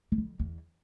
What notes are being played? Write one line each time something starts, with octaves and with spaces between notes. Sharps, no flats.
E2
F2
E2